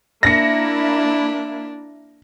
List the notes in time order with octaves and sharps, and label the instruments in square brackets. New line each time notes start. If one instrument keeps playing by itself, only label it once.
[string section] A#3 E4 [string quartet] D4 [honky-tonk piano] A#6 C#7